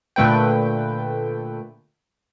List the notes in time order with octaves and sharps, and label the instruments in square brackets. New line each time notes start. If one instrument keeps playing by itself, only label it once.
[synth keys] A#2 D3 A3 B4 G5